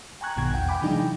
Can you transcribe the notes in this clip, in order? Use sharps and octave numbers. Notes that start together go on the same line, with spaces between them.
G5 G#5 A#5 C#6 F#6 G#6
A#1 G2 B2 D#3 G#6
E2 F#5 G5
F5 G5 G#5 B5 D6
C3 E3 F#3 G#3 D4 D#4
G5